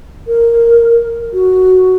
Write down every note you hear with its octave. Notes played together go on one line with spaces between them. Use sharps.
A#4
F#4